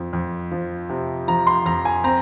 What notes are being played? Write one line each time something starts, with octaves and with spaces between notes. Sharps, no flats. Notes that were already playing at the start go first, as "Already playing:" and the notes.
Already playing: F2 F3
F2
F3
C3
F3 A#5
C6
F2 A#5
G#5
C4 A#5